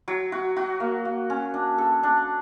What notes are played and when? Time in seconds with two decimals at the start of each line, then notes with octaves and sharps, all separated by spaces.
0.08 F#3
0.32 F#4
0.56 F#4
0.80 A#3
1.05 A#3
1.30 C#4
1.54 D4
1.78 A4
2.03 D4